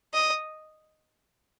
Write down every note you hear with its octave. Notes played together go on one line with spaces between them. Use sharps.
D#5